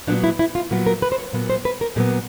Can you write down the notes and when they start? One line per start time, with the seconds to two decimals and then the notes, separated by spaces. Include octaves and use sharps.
0.07 A#2 F#3 B3 D4
0.24 E4
0.39 E4
0.55 F4
0.71 A#2 F#3 B3 F#4
0.87 A#4
1.02 B4
1.12 C5
1.18 C#5
1.33 A#2 F#3 B3
1.50 C5
1.65 B4
1.81 A#4
1.96 A#2 F#3 B3 G#4